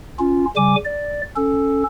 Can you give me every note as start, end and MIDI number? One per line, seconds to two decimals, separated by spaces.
0.19 0.46 61
0.19 0.46 65
0.56 0.76 49
0.56 0.76 55
0.56 0.76 80
0.56 0.76 86
0.85 1.22 74
1.36 1.84 61
1.36 1.84 69